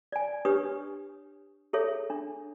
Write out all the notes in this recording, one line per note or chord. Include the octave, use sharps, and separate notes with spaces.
D5 G#5
D4 G4 B4 C#5 C#6 D#6
G#4 A4 C#5 E5
D4